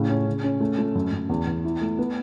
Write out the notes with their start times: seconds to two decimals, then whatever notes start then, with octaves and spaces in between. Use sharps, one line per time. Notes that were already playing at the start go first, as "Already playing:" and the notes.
Already playing: A2 C#3
0.09 C#4
0.27 C#3
0.44 C#4
0.61 A3
0.78 A3
0.95 F#2
1.12 F#2
1.29 E2
1.47 E2
1.64 E4
1.81 A3
1.99 B3